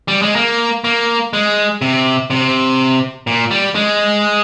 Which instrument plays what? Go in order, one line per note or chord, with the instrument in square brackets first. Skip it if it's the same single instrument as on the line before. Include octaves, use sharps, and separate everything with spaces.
[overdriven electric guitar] G3
G#3
A#3
A#3
G#3
C3
C3
A#2
G3
G#3